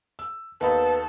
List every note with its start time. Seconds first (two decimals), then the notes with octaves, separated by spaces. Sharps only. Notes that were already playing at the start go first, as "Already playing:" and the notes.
0.19 E6
0.61 D#2 B3 D#4 A4 B5